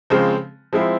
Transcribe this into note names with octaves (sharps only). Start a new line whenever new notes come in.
C#3 F3 G#3 C4
F3 G#3 C4 E4